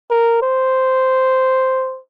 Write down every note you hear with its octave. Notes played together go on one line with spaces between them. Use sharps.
A#4
C5